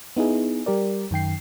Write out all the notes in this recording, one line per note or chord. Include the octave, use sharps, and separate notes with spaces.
B3 D#4 E4 G#4
G3 G4 A#4 D5
F#2 D#3 G5 C7